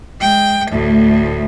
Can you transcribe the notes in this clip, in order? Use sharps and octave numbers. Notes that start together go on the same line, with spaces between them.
G#3 G5
D2 A2